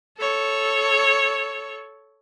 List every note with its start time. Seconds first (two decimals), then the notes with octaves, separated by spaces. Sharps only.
0.18 A4 C#5